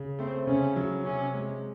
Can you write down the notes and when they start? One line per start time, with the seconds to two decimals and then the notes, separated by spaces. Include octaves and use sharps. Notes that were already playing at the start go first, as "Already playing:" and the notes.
Already playing: C#3
0.19 A3 C4
0.47 C#3 C#4
0.76 F#3
1.05 C3 C#4
1.34 G#3